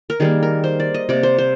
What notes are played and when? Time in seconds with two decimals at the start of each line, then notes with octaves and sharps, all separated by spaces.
0.10 A#4
0.20 D#3 G3 A#3 G#4
0.43 A#4
0.64 C5
0.80 D5
0.94 D#5
1.09 C3 G3 A#3 D5
1.23 C5
1.38 C5